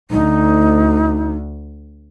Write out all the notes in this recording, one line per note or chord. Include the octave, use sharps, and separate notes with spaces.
D2 D#4